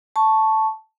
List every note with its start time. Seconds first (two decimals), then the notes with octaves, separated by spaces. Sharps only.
0.16 A5 C#6